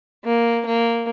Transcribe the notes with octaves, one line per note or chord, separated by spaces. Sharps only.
A#3
A#3